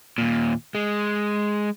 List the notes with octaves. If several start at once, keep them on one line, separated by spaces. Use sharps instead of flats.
D#2 A#2
G#3